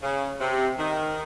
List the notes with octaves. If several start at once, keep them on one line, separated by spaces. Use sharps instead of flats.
C#3
C3
D#3